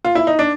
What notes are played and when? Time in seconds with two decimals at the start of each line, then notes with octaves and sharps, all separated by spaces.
0.05 F4
0.15 E4
0.27 D#4
0.39 D4